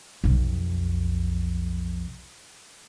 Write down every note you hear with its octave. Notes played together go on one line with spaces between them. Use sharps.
B1 F2